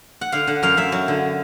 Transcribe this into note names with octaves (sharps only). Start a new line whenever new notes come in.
F#5
D3 F5
D3 F#5
F#2 F5
F#2 E5
F#3
D3